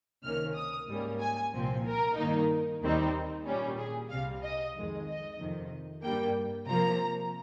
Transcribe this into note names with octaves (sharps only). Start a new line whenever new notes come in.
C#2 C3 D#3 A#3 C#4 F6
D#6
G#2 G3 A#3 C#4
G#5
C2 A#2 F3 C4
A#4
G2 D#3 A#3 D#4
D#2 D#3 G3 C4 D#4
A#2 G3 C#4
G#4
C2 C3 G3 F5
D#5
F2 D#3 G#3
D#5
F2 C3 D#3
G2 G3 A#3 G5
C3 F3 A#3 A#5